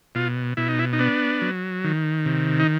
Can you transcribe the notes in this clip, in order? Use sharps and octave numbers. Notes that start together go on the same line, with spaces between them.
B2 F4
B2 E4
D#4
E4
D#4
B3 D4
F#3
D#3
C3
D#4